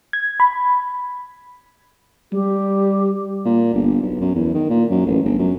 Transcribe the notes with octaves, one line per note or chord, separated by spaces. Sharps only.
G#6
B5
G3 G4
A#2
G1
B1
F#2
E2
D#3
A#2
F#2
A1
G1
F#2